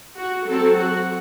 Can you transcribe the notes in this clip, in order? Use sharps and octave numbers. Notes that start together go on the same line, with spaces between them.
F#4
F#3 C4 A4
F#4